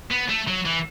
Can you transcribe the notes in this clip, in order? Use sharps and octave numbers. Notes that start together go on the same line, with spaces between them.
B3
A3
F#3
E3